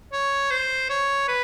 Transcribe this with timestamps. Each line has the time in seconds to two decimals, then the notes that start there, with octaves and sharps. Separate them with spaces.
0.13 C#5
0.51 C5
0.90 C#5
1.28 B4